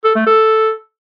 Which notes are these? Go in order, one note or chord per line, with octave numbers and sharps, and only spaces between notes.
A4
A3
A4